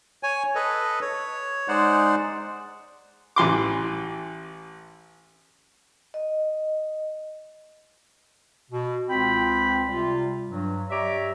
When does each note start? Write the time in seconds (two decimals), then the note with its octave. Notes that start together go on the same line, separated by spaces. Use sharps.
0.23 C#5 G#5
0.55 A4 B4 D#5
1.02 C#5
1.68 G#3 D#4 C5 D5 F#5
3.36 A1 E3 C6 D6
6.14 D#5
8.71 B2
9.09 C#2 C4 F4 G5 B5
9.88 C3 G3 F4
10.48 G2 F#3
10.90 G4 C#5 D5 E5 A#5 D6